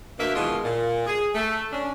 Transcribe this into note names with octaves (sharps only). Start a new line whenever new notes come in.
D2 B2 A#3 E5
B2 D#3 E3 G#3 F4
A#2
G#4
A3
C#4 D4